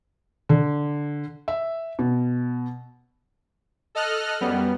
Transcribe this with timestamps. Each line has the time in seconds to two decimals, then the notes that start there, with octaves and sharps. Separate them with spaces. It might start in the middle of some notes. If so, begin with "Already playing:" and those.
0.49 D3
1.48 E5
1.99 B2
3.95 A4 D#5 F6 F#6
4.41 F#2 G3 B3